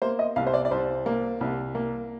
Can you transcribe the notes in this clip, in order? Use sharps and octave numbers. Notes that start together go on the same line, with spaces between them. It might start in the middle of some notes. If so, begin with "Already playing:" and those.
A#3 C5
D#5
C2 F5
C5
D5
D5
C2 C5
A#3
C2
A#3